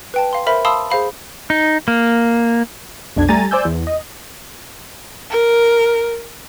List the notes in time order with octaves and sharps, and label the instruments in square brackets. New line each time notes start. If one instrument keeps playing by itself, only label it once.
[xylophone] B4 G5 A5
F5 C6
A#4 C5 E5 B5
F5 A5 B5 C6 D#6 E6
G#4 C5 F5 B5
[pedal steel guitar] D#4
A#3
[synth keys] B1 F2 D4 G#6
G3 A3 G#5 A#5 A6 D#7
C5 D5 G#5 E6 G6
E2
D#5
[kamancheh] A#4